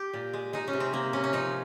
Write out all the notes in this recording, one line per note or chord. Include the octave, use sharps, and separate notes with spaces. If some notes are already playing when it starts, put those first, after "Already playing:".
Already playing: G4
A#2
G#3
G#3 D#4
C#4
C3
C4
C3 A#3
C3 C#4
C#4
F3 D#4